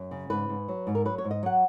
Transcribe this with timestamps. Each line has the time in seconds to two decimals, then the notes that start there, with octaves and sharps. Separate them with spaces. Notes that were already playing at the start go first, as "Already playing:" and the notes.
Already playing: F#2
0.11 C#3
0.30 G#2 B4
0.49 G#2
0.68 F#3
0.87 G#2
0.95 A#4
1.05 F#3 B4
1.18 C#5
1.24 G#2
1.31 D#5
1.43 F#3 F#5